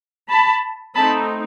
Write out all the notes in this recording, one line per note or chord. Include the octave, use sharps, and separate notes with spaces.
A5 B5
A3 C4 D#4 A5 B5